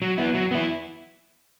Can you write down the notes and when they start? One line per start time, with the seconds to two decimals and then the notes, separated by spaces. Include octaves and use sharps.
0.02 F#3
0.18 B3 E4
0.34 F#3
0.51 B3 E4